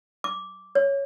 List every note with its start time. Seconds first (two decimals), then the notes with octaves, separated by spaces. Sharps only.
0.24 D6
0.75 C#5